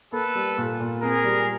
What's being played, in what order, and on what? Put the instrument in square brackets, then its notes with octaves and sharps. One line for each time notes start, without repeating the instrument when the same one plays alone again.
[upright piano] A#3 [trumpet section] A4 B4
[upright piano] G3
A#2
A#2
[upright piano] C4 [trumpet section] G#4 A#4
[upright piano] G3